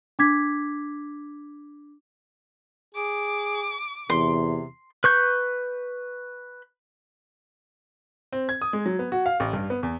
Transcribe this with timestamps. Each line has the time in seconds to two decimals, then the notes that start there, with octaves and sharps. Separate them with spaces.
0.19 D4 D6 G#6 B6
2.95 G#4 D6
4.10 E2 C3 C6
5.04 B4 C#6 G6
8.33 C4
8.49 G#6
8.62 D#6
8.73 G#3
8.86 F#3
8.99 B3
9.12 F#4
9.26 F5
9.40 A1
9.53 G2
9.70 B3
9.83 E2